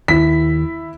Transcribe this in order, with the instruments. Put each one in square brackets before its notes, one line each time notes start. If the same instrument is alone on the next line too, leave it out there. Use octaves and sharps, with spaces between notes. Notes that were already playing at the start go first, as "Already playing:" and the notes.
[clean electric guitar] D#2 [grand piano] E4 B6